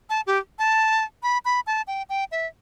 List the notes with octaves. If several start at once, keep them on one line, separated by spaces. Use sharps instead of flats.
A5
G4
A5
B5
B5
A5
G5
G5
E5